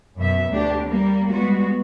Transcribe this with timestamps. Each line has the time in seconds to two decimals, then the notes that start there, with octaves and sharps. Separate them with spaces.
0.16 F#2 B2 E5
0.51 D2 D4 G4
0.84 G3 A#3
1.30 G3 G#3 B3 F#4